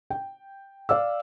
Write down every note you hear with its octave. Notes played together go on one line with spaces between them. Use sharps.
G5
D5 F5 E6